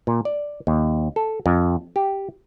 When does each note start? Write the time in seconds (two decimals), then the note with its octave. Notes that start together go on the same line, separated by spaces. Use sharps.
0.07 A#2
0.25 D5
0.67 D#2
1.16 A4
1.46 F2
1.96 G4